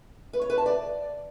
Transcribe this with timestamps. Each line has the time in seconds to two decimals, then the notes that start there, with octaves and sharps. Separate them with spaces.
0.33 B4
0.41 C#5
0.50 B4
0.58 A5
0.66 D5